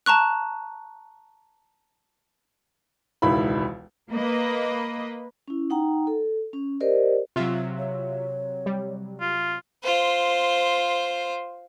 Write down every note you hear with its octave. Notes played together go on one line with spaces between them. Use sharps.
A5 A#5 C#6 F#6
E1 C#2 D#3 E4 B5
A#3 B4 D#5
C#4 E4
D#4 F#5 G5 A#5
A4
C#4
G4 A#4 C5 D5 D#5
C3 F#3 F4 E5
C#5
G3
F4
F4 C5